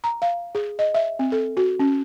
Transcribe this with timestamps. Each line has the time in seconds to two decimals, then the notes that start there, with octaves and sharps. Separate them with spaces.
0.04 A#5
0.22 F5
0.55 G#4
0.79 D#5
0.94 E5
1.19 C4
1.32 A4
1.57 F#4
1.80 C#4